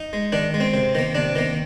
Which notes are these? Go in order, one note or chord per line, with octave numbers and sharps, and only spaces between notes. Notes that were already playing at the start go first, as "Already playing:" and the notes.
Already playing: D#4
G#3
D#3 D4
G#3
C4
C3
D#3 A#3
C3 D4
D#3 A#3